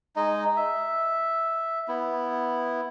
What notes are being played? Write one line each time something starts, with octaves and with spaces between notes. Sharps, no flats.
G#3 D#4 D#5
E5
B3 E4